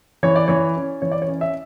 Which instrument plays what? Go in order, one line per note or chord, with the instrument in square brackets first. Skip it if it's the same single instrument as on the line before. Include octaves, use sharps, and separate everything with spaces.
[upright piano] E3 C#5
D5
E3 C#5
C#4
E3 C#5
D5
C#5
C#4
E5